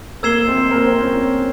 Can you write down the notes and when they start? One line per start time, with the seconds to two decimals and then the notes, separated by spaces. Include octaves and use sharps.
0.23 A#3 A#4 E6 G#6 C7 E7 G7
0.48 C4 C5
0.71 A#3 A#4
0.87 C4 C5
1.03 C#4